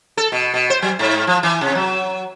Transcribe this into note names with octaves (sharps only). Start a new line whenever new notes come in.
A4
B2
B2
C5
F#3
G#2
F3
E3
C3
F#3